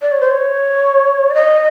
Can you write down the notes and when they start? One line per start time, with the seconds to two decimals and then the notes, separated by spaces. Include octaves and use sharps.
0.02 D5
0.12 C#5
0.21 C5
0.31 C#5
1.30 D5
1.34 D#5